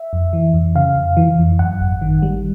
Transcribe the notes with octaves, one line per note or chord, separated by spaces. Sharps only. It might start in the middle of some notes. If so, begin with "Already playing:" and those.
Already playing: E5
F2
E3
F2
C#3 F5
F2
E3
F2
F#2 F#5
G#1
D#3
G3